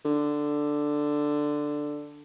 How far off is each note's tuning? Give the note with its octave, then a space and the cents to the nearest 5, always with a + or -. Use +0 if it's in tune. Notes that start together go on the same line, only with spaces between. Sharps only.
D3 +5